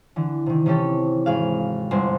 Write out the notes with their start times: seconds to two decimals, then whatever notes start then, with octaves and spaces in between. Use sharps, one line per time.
0.16 D3 E3
0.46 C3 D#3
0.66 C3 E3 C#4 G4 A4
1.26 G#1 G#4 F5
1.91 G1 C5 G#5